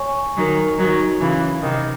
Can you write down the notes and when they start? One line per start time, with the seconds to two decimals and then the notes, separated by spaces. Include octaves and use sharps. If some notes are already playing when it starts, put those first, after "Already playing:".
Already playing: C#5 G#5 C#6
0.37 D#3 F#3
0.78 D#3 F#3
1.21 C#3 E3
1.62 C3 D#3